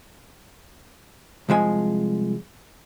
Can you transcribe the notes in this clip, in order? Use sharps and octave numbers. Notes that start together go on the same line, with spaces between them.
C2 F3 G#3 G#5